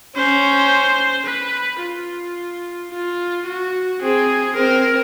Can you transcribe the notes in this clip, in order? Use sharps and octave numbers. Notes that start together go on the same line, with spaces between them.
C#4 C5
B4
F4
F4
F#4
C4 G#4
C4 A#4